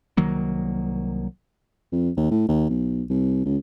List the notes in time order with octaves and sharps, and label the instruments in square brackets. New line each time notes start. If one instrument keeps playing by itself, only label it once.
[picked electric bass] C2 D#3 F#3 A#3
[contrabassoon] F2
D#2
A2
D#2
B1
C2
C#2